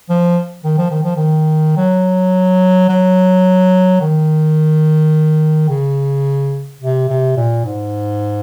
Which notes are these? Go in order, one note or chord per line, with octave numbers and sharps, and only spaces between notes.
F3
D#3
F3
D#3
F3
D#3
F#3
F#3
D#3
C#3
C3
C3
A#2
G#2